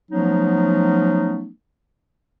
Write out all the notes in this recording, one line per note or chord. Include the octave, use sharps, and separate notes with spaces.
F3 F#3 A3 B3 C#4 D#4